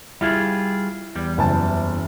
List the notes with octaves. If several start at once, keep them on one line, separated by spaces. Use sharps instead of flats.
G3 E4 F4 G#4
E2 G3
F#1 E3 A5